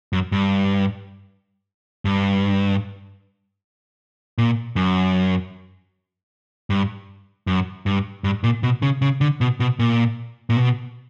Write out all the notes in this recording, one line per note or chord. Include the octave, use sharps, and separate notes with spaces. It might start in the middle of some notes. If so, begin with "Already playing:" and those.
F#2
G2
G2
A#2
F#2
G2
F#2
G2
G2
A#2
B2
C#3
C#3
D3
B2
B2
A#2
A#2
B2